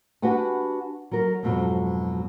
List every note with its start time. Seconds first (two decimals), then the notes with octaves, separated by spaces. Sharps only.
0.22 D4 F#4 G4 B4 F#5 G#5
1.11 F#3 A#4
1.43 F2 G#2 B2 F#3